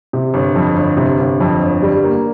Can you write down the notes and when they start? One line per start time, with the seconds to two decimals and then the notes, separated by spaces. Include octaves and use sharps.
0.13 C3
0.34 G1
0.56 F2
0.77 G1
0.97 C3
1.19 G1
1.41 F2
1.61 G1
1.82 G3
2.04 A#3